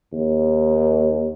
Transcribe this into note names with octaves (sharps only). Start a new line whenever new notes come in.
D#2